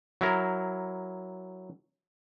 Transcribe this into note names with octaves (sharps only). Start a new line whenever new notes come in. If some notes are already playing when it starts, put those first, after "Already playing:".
F#3 E4 A#4